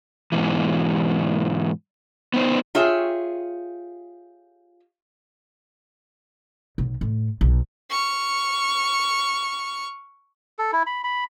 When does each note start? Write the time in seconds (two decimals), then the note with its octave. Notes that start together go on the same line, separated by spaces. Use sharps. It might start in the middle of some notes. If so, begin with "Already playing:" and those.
0.32 G#2 B2 E3
2.34 B3 D#4 C5
2.75 F4 G4 G#4 C#5 E5
6.78 B1
7.01 A2
7.41 B1
7.90 C#6 F6
10.59 A4
10.73 E4
10.86 B5
11.04 B5